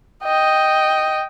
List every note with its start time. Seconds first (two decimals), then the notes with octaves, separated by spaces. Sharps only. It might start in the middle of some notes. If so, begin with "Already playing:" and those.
0.23 D#5 G5